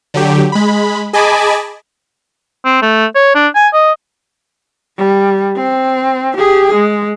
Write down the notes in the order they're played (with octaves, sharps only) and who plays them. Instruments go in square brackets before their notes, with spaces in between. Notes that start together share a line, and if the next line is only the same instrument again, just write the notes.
[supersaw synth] D3 F#3 G4
G#3 B5
G#4 D#5 G#5 A5 B5 D6
[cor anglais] C4
A3
C#5
D4
G#5
D#5
[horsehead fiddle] G3
C4
G4 G#4
G#3